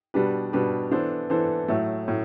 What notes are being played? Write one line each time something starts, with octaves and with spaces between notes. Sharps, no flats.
B2 G3 D4 G4 B4
B2 G3 D4 G4 B4
E3 B3 D4 A4 C5
E3 B3 D4 A4 C5
A2 F#3 A3
A2 F#3